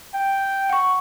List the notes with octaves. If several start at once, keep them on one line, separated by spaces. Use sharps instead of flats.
G5
F#5 C#6